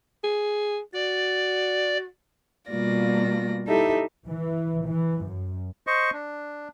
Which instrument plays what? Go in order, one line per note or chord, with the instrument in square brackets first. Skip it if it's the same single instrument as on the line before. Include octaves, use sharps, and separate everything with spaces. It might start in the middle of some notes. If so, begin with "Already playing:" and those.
[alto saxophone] G#4
[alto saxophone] F#4 [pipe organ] D5
[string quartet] B2 G3 A#3 F4 D5 A#6
D#4 E4 G4 A4 E5
[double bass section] E3
E3
F#2
[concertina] C5 D#5 C#6
D4